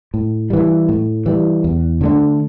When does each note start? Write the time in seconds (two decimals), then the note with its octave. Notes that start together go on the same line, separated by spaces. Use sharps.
0.14 A2
0.50 E3 G3
0.89 A2
1.26 E3 G3
1.64 E2
2.01 D3 A3 D4